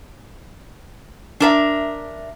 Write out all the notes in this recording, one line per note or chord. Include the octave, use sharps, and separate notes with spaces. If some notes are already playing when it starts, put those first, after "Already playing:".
D4 A#4 E5